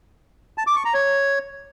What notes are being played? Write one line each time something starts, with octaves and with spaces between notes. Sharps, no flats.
A5
D6
C#6
A#5
C#5